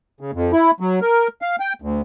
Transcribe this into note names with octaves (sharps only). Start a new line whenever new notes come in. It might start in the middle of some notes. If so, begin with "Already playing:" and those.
C#3
F2
E4
F#3
A#4
F5
G5
D2